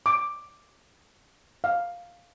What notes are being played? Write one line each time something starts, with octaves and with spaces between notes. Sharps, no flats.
D6
F5